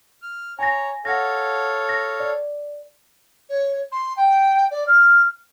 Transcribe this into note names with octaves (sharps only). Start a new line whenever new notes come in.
F6
C#5 G#5 A#5 A#6
A4 C#5 F5 F#5 A#6
A#6
D5
C#5
C6
G5
D5
F6